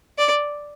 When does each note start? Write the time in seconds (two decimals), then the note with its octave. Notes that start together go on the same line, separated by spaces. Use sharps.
0.18 D5